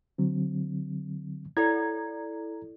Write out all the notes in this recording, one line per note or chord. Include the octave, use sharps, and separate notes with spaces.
D3 F#3 C4
E4 A4 D5 A#5 G#6